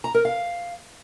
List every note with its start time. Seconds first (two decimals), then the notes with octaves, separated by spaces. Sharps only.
0.04 A#5
0.14 A#4
0.25 F5